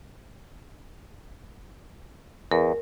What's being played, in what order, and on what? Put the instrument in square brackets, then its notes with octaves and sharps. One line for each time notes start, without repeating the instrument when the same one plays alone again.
[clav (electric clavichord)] E2 [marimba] A#4